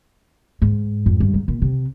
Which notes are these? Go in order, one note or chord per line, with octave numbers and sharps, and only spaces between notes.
G#2
F2
G2
G#2
A#2
C3